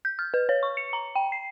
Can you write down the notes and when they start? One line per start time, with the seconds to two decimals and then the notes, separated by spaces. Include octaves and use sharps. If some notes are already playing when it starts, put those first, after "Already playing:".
0.05 G6
0.19 F6
0.34 B4
0.49 C#5
0.63 C#6
0.77 C#7
0.93 A#5
1.15 G5
1.32 C7